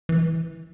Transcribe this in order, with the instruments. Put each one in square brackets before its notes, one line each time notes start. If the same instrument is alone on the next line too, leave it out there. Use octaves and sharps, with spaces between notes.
[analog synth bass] E3